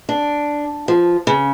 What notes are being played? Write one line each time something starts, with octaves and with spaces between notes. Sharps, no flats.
D4
F3
C#3